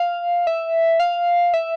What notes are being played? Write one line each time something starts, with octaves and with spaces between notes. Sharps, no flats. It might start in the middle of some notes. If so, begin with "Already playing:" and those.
Already playing: F5
E5
F5
E5